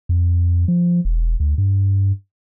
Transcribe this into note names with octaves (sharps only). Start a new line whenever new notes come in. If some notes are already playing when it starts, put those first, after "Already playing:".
F2
F3
E1
D2
G2